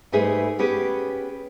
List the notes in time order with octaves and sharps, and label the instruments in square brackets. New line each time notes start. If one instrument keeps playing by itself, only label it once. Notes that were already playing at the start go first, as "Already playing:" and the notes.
[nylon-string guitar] G#2 G3 A3 G#4 B4
B3 C#4 G4 G#4 B4